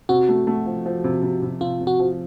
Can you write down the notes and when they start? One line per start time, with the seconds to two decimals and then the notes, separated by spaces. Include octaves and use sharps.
0.09 C3 F#4
0.29 A3
0.47 A3
0.66 F3
0.86 F3
1.04 C3
1.23 C3
1.42 C3
1.61 C3 F4
1.80 C3
1.87 F#4
2.00 F3